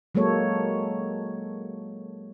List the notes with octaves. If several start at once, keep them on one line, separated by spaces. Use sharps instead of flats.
F#3 G#3 A#3 A4 C#5